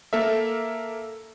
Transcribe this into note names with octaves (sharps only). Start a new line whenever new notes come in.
A#3 A4 A#4 E5